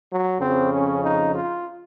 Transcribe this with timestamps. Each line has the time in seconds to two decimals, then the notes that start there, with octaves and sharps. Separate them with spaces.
0.10 F#3
0.40 F2 C#3 F3 C4
0.71 C#4
1.03 D#4
1.33 F4